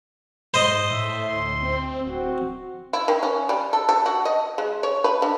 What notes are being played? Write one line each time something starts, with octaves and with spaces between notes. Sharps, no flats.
G#2 C5 D#5
A2 E5
D2 C6
C4
D1 C4 F#4
E4
D#3
C#4
G3
A4
A4
F#4
D#5
G#3
C#5
B4
D3